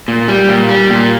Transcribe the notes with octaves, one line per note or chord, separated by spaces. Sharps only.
A#2
G3
A#2
G3
A#2